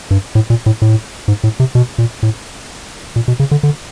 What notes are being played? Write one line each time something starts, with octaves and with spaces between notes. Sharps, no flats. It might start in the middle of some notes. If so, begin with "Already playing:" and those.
G2
A2
A#2
A2
A2
G#2
A2
C3
B2
A#2
A2
A#2
B2
C#3
D3
D3